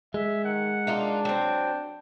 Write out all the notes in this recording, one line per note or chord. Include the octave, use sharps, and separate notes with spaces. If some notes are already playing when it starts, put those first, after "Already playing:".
G#3 E5
D#3 F#5
A#3 D4 D#4 F4
F#3 C4 G5